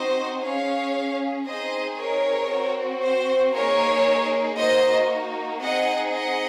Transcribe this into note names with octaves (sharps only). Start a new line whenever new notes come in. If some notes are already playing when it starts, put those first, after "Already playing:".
Already playing: C4 D#4 F#4 C5 D#5
C#4 G#4 C#5 F5
C4 D#4 G#4 C5 D#5
A#4 C#5
C4 F#4
C5
A#3 D#4 G#4 A#4 C#5
A#3 D#4 F#4 C5 D#5
C4 D#4 G#4 D#5 F#5
D#5 F#5